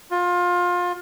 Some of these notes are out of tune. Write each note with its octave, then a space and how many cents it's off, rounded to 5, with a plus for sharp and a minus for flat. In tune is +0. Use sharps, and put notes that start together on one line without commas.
F4 +25